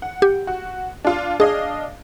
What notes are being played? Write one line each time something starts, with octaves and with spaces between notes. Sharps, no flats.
F#5
G4
F#4
D4 F4
D4 G#4 D#5 F5